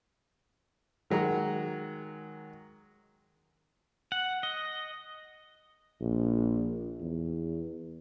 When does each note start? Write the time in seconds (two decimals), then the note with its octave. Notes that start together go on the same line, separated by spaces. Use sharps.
1.10 D#3 F#3 G#3 A#5
4.12 F#5
4.43 D#5
6.01 A#1
7.00 E2